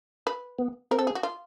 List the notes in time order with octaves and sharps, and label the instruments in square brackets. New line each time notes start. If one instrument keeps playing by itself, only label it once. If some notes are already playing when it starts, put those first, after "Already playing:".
[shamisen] B4
[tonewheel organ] B3
[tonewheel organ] C4 [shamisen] A#4
[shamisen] A4
G#4
F#4
F4